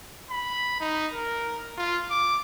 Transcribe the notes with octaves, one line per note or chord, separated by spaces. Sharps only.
B5
D#4
A#4
F4
D6